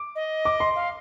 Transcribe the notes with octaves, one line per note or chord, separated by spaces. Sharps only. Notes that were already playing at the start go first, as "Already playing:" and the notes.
Already playing: D6
D#5
D6
C6
F5